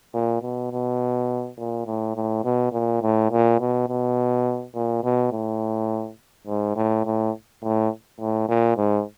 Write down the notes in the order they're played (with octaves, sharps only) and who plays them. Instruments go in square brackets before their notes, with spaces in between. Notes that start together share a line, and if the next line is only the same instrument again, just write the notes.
[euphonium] A#2
B2
B2
A#2
A2
A2
B2
A#2
A2
A#2
B2
B2
A#2
B2
A2
G#2
A2
A2
A2
A2
A#2
G#2